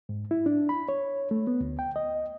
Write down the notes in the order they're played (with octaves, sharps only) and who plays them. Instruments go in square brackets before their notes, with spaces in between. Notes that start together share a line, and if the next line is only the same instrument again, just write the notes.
[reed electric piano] G#2
E4
D4
B5
C#5
A3
B3
D2
G5
D#5